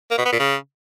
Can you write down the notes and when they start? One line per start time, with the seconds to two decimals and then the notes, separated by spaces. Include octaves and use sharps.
0.11 A#3
0.18 B2
0.25 B3
0.33 A#2
0.40 C#3